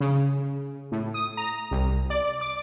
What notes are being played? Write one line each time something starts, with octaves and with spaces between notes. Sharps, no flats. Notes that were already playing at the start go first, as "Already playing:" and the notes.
C#3
A2
D#6
A#5
C2
D5
D6